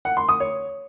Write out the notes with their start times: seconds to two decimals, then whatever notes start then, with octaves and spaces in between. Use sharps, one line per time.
0.05 F#5
0.17 C6
0.29 D#6
0.40 C#5